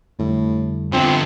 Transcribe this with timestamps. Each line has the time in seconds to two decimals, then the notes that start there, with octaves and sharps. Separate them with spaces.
0.19 F2 A2 D3 G3
0.93 D3 F3 B3 C4